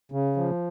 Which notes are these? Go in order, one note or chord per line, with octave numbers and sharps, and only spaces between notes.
C#3
F3